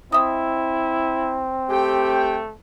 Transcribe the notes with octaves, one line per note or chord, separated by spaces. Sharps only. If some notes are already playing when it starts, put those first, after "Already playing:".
C4 E4 D#5 E5
A3 G4 G5